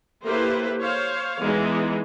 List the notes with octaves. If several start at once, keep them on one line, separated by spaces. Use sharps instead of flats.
A#3 E4 G4 A4 B4 C5
C5 C#5 F5
E3 G#3 B3 D#4